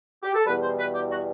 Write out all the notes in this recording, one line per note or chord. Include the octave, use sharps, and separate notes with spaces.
G4
A4
E2 B2 G3 B4
C5
B4
G4
F#4